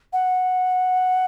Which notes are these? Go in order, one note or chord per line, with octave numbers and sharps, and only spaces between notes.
F#5